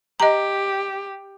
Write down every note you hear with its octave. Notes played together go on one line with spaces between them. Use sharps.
G4 D#5 A#5